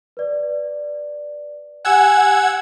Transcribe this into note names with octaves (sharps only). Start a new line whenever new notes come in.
B4 D5
G4 F#5 G#5 E6 G#6 E7